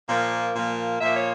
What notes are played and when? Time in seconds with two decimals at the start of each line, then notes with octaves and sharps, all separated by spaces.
0.09 A#2 F3 A#3
0.54 A#2 F3 A#3
1.01 A#2 F3 A#3 E5
1.16 C#5